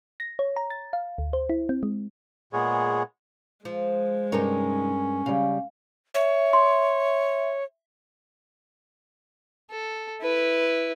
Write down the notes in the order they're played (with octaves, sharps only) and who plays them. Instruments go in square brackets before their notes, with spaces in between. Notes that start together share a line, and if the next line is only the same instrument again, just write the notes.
[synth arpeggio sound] A#6
C#5
A#5
A6
F5
D2
C5
E4
C4
G#3
[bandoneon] A#2 G#4 [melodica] G#3 B3 C#5
[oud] F3 [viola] G#3
[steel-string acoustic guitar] G2 A#4 [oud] C3 D#4 C#5 [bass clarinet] C#4
[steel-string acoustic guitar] C#3 G3 [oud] F5
[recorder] C#5 [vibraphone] E5
[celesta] C6
[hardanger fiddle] A4
E4 B4